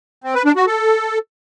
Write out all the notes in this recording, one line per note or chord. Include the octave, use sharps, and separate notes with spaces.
C4
B4
D4
F#4
A4